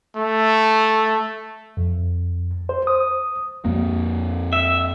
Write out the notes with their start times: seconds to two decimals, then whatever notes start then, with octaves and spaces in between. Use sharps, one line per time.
0.16 A3
1.77 F2
2.69 C5
2.87 D#6
3.65 F2 A#3
4.53 E5